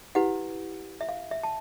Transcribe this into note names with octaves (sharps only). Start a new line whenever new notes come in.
E4 G4 B4 F#5
E5
F5
E5
A5